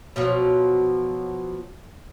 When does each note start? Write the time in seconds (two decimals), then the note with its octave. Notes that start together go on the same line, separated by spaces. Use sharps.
0.16 B2 F3 F#3